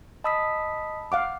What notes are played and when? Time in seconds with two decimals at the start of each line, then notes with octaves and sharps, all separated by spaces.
0.24 D#5 A5 B5 D#6 E6 B6
1.12 F5 F#5 D6